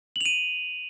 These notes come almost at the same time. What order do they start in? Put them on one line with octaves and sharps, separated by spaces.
F#7 F7 D#7